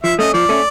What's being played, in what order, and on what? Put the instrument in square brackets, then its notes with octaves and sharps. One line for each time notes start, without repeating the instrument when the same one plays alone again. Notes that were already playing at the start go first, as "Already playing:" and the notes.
[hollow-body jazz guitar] F3 [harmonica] E5
[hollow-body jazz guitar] A3 C#4 [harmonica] D#5
[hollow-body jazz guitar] F3 [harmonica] D5
[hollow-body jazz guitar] A3 C#4